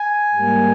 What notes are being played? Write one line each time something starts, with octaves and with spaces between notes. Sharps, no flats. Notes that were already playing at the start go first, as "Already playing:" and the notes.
Already playing: G#5
G#2 G3 A#3